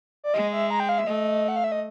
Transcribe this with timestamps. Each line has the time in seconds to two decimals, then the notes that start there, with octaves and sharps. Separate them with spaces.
0.24 D5
0.34 G#3 D#5
0.53 E5
0.70 A#5
0.80 G5
0.89 F5
0.98 E5
1.07 A3 D#5
1.48 F#5
1.56 F5
1.64 E5
1.72 D#5